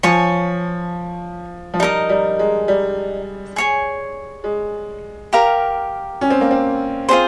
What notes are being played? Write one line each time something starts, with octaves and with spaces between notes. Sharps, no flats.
F3 C#5 G#5 C#6
F3
G3 D#4 A#4 D#5
G3
G#3
G3
G#4 C#5 G#5
G#3
G4 A#4 F5 A#5
C#4
C4
A#3
C4
C4 F4 G#4 C5